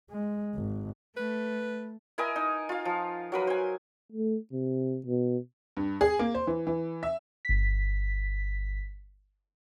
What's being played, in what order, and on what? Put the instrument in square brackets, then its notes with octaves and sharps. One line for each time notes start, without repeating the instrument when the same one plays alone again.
[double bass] G#3
G#1
[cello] A3 [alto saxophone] B4
[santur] E4 A#4 D#5 G#5
D#4
F4 F5
F3
F#3 A#4 B4
C5 G#5
[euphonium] A3
C3
B2
[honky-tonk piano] G2
G#4
A#3
C5
E3
E3
E5
[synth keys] G1 B6